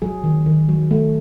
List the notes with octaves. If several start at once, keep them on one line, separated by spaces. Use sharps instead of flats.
F#3 G#4
D#3
D#3
F#3
A3